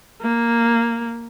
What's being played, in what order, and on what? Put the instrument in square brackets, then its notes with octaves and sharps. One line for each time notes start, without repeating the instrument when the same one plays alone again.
[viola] A#3